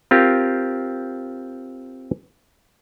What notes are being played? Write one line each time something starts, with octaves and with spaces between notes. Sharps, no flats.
C4 F4 G4 A#4